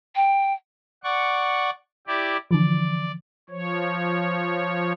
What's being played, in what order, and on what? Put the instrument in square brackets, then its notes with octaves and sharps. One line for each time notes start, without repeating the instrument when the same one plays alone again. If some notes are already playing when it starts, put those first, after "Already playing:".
[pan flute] G5
[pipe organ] D5 F#5 C#6
E4 G4 D5
[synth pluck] D3 E3 F3 [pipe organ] D5
[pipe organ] F3 C#5